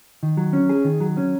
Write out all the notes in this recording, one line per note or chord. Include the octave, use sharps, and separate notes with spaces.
D#3
F#3
C#4
G#4
D#3
F#3
C#4